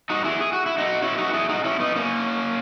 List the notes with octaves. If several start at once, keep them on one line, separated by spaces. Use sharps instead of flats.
D#4 F#4
E4 G#4
G#4
F#4
E4
D#4 F#4
C#4 E4
D#4 F#4
E4 G#4
D#4 F#4
C#4 E4
B3 D#4
A#3 C#4